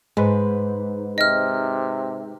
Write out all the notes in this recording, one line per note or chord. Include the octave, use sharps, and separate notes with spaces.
G#2 G#3 B4 C5
C3 D#5 F6